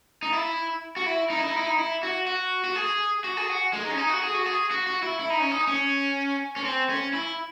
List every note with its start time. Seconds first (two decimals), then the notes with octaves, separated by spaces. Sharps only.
0.23 D#4
0.33 E4
0.97 F#4
1.06 E4
1.30 D#4
1.39 E4
1.48 D#4
1.57 E4
1.66 D#4
1.78 E4
2.03 F#4
2.27 F#4
2.64 F#4
2.76 G#4
3.24 F#4
3.37 G#4
3.49 F#4
3.73 G#3
3.85 D#4
3.91 C#4
3.98 D#4
4.09 F#4
4.22 G#4
4.34 F#4
4.46 G#4
4.71 F#4
4.87 F#4
5.03 E4
5.19 E4
5.30 D#4
5.40 C#4
5.51 D#4
5.67 C#4
6.56 C#4
6.65 C4
6.90 C#4
7.13 E4